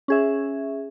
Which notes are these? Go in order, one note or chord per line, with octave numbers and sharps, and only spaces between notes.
C#4 G#4 E5